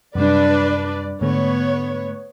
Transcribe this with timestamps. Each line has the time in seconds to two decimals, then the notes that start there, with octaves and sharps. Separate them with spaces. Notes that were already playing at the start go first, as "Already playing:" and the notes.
0.15 F#2 C3 G3 D4 B4 D5
1.21 G#2 D3 A3 B3 C#5